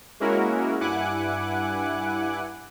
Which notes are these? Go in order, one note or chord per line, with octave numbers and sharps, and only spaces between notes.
G#3 A#3 C#4 E4 F#4 A#4
G2 E4 F#5 G#5 D6 F#6